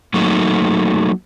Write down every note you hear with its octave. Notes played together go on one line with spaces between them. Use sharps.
F#3 A3 A#3 D#4